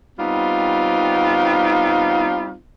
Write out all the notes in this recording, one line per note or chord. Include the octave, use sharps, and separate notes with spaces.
G3 B3 C4 D#4 F4